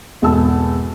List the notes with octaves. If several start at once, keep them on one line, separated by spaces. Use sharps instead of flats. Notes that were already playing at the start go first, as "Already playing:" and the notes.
G#1 E2 B2 A4 A5 E6